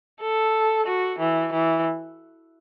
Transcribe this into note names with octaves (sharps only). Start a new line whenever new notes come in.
A4
F#4
E3
E3